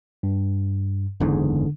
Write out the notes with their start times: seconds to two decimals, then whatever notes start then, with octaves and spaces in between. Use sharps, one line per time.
0.23 G2
1.20 F#1 E2 G#2 D3